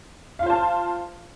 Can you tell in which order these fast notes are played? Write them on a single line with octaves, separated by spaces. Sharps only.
F5 F4 C5 A5